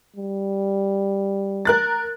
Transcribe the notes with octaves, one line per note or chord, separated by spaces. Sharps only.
G3
A#4 F#6 A6